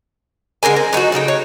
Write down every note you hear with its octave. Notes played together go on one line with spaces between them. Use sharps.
D3 G#3 A#4 G#5
C4
F#3 D#4 F4 F#4
A2 C#3 D#4 G5
C#5